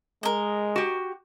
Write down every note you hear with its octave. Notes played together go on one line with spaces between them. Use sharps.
G#3 A#4 D#5
F#4 G4